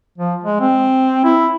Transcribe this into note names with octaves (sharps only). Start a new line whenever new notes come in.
F3
G#3
C4
E4